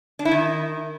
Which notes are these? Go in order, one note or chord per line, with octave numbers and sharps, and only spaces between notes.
D4
E4
D#3